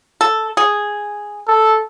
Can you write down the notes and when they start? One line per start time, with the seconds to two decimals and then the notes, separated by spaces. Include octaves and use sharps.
0.21 A4
0.57 G#4
1.48 A4